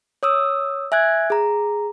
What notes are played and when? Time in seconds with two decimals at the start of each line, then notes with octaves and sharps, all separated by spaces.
0.23 C#5 D#6 E6
0.92 E5 G#5 F#6 G#6
1.30 G#4 A#5